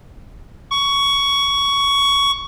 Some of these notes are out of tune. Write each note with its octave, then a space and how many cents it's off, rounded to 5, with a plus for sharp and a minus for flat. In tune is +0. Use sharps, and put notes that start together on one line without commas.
C#6 +15